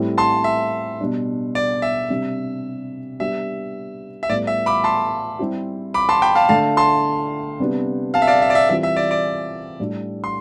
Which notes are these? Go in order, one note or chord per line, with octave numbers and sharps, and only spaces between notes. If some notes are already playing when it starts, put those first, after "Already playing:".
Already playing: A2 G3 C4 E4
A5 C6
E5
B2 G3 D4
D5
E5
C3 G3 D4
G3 B3 D4 G4 E5
E5
A2 G3 B3 D5
E5
B5 D6
A5 C6
G3 C4 E4 G4
B5 D6
A5 C6
G5 B5
F5 A5
D3 A3 D4 F5 A5
A5 C6
C3 G3 B3 D4 G4
F5 A5
E5
D5 F5
E5
D5
E5
E3 G3 C4 F4 E5
E5
D5
D5
A2 G3 D4 G4
C6